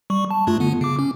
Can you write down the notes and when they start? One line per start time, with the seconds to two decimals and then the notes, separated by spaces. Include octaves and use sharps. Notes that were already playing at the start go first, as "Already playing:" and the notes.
0.10 G3 C#6
0.31 A5
0.47 G2 A3 F4
0.60 D3 B3
0.81 C#3 D6
0.99 C#4